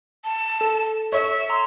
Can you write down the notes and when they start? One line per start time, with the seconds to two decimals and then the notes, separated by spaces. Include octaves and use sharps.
0.24 A5
0.61 A4
1.12 C#5 E5
1.50 A#5 C6